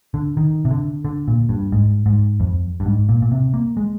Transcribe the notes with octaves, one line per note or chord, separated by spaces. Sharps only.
D3
D#3
C3
D3
D3
A#2
G2
G#2
G#2
F2
G2
G#2
A#2
A#2
C3
A#3
G#3